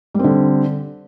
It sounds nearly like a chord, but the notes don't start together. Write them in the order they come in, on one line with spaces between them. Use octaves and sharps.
G3 C4 D3